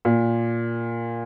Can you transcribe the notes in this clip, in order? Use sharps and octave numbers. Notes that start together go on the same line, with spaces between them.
A#2